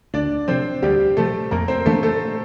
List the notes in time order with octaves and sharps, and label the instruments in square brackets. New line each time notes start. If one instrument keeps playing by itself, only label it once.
[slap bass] D2 [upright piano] D4 D5
[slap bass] C3 F3 [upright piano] C4 C5
[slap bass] D2 [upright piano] G3 G4
[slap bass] C3 F3 [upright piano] A3 A4
[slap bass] F2 [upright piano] A#3 A#4
[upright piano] C4 C5
[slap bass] E3 A#3 D4 [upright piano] A3 A4
[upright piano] A3 A4